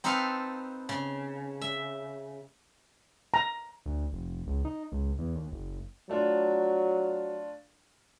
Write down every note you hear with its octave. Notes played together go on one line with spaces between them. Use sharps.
C4 D#4 A4 B4 F5
C#3
E5
A#5
D2
F1
C#2
D#4
C#2
E2
D#2
F#1
F#3 A3 D4 F4